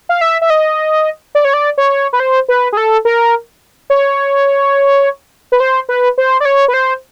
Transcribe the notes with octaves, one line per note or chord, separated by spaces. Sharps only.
F5
E5
E5
D#5
D5
C#5
D5
C#5
B4
C5
B4
G#4
A4
A#4
C#5
B4
C5
B4
C5
D5
C#5
B4
C5